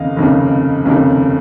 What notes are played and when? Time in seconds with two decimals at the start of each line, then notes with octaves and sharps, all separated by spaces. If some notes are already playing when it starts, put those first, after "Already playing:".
Already playing: F1 D#2 C#3 D#5 F5
0.16 F1 D#2 C#3
0.85 F1 D#2 C#3